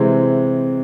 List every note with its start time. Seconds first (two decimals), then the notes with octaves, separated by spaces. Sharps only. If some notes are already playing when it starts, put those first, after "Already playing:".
Already playing: C3 E3 G#3 C4